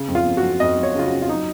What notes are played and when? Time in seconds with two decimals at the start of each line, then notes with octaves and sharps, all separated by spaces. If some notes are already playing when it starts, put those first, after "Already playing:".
Already playing: C#3
0.08 F2
0.15 F4
0.26 F2
0.37 F#4
0.43 F2
0.60 F2 D#5
0.77 F2
0.83 C#5
0.95 C#3 F4
1.06 F#4
1.12 C#3
1.22 F4
1.28 F#3 D#4